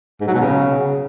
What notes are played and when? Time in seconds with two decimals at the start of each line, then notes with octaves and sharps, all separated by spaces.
0.21 G#2
0.28 F#3
0.34 B2
0.41 C#3